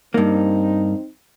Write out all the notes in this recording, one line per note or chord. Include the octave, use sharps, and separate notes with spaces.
G2 A#3 C4 D#4